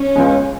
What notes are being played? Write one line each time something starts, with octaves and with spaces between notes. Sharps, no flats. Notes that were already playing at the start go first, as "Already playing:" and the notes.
Already playing: C#4
C#2 C#3 G#3